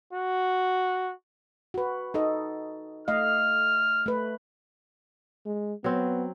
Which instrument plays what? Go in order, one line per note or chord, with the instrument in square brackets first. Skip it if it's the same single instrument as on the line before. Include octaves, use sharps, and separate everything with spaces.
[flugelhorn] F#4
[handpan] F#4 B4
D#4 A4 D#5
[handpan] A3 D#5 F5 [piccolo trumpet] F6
[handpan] A3 B4
[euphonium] G#3
[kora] F#3 C4 [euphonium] B3